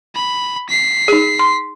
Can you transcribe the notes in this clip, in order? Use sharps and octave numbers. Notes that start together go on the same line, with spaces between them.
B5
B6 C7
D#4 G#4
C6